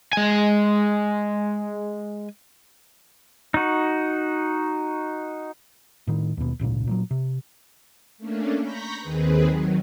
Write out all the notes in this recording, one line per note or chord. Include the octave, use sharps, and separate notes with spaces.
G#3 G#5
D#4 F#4
A2 D#3
D#2 B2
D#1 G#1 C#2 A#2
A#2 F3 F#3
C3
A3 A#3 C#4 D4
A#5 B5 C#6 G6 A#6 B6
D#2 D#3 C4 G#4 B4
D#3 F#3